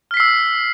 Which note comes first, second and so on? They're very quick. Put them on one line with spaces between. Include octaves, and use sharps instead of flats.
F6 B6 C7 E6